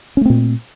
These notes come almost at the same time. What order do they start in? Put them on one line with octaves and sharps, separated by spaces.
C#4 A3 C4 A#2